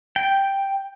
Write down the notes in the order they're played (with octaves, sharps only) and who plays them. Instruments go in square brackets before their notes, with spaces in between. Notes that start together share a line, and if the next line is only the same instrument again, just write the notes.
[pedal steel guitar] G5